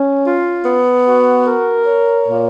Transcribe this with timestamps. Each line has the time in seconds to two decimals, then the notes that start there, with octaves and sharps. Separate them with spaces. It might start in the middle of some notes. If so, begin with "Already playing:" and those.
Already playing: C#4
0.25 F4
0.66 B3
1.06 F#4
1.47 A#4
1.86 C#5
2.28 A#2